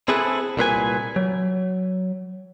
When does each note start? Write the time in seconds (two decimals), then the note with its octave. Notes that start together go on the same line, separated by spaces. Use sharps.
0.08 C4 E4 G#4 A4 B4
0.57 C2 A#2 B4 G#5
1.16 F#3